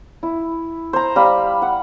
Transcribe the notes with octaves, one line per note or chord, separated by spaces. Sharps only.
E4
C5 A#5
G3 F5 B5
F#5